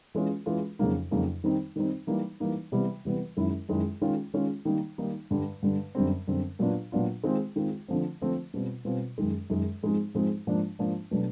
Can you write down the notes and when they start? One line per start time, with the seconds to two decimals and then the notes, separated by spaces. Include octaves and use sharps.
0.15 E3 G#3 C#4 F4
0.46 E3 G#3 C#4 F4
0.79 F2 C#3 F#3 A#3 D#4
1.11 F2 C#3 F#3 A#3 D#4
1.44 D#3 G3 C4 D#4
1.76 D#3 G3 C4 D#4
2.07 E3 G3 A#3 D#4
2.40 E3 G3 A#3 D#4
2.72 C3 E3 G3 B3
3.05 C3 E3 G3 B3
3.37 F#2 D#3 G#3 C#4 E4
3.69 F#2 D#3 G#3 C#4 E4
4.02 D#3 G#3 C#4 F4
4.34 D#3 G#3 C#4 F4
4.65 D#3 G3 A#3 D#4
4.98 D#3 G3 A#3 D#4
5.31 G2 D3 G3
5.62 G2 D3 G3
5.95 F#2 D3 G3 C4
6.28 F#2 D3 G3 C4
6.59 A#2 F#3 B3 D4 F4
6.92 A#2 F#3 B3 D4 F4
7.24 D#3 G#3 C4 F4
7.56 D#3 G#3 C4 F4
7.88 D3 F3 A3 C4
8.22 D3 F3 A3 C4
8.54 B2 G3 C4 F4
8.85 B2 G3 C4 F4
9.18 F#2 D#3 G#3
9.50 F#2 D#3 G#3
9.82 G#2 F3 G#3 C4 D#4
10.14 G#2 F3 G#3 C4 D#4
10.47 G#2 F3 A#3 D4
10.79 G#2 F3 A#3 D4
11.11 B2 F#3 A3 D4